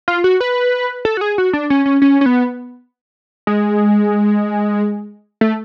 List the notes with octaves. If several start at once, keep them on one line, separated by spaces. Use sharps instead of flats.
F4
F#4
B4
A4
F#4
G#4
F#4
D4
C#4
C#4
C#4
C#4
B3
G#3
A3